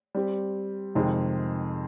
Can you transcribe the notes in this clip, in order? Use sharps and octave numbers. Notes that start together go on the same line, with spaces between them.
G3 C4 G4
F2 C3 D#3 G#3 C4